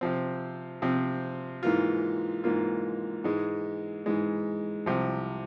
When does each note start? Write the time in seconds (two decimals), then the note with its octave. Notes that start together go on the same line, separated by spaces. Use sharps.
0.01 C3 F3 C4
0.82 C3 F3 C4
1.63 G#2 E3 A#3 F4
2.44 G#2 E3 A#3 F4
3.24 G#2 E3 G#3
4.06 G#2 E3 G#3
4.86 C2 C3 F3